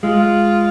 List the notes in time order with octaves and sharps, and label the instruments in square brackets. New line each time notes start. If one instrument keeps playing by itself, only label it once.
[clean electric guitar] G#3 [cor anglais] F4